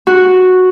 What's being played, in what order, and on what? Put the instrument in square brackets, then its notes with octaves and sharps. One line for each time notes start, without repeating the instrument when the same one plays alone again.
[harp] F#4